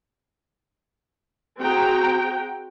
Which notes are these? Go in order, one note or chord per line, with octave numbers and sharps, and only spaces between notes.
C4 F#4 G#4 G5 A#5